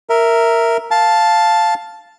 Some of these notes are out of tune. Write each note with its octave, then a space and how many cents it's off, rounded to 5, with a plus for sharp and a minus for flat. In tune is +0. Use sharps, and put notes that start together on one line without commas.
A#4 -5 E5 +0
F5 +0 A5 -5